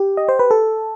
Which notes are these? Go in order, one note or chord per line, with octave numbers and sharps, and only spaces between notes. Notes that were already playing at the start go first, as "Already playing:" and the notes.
Already playing: G4
D#5
C5
B4
A4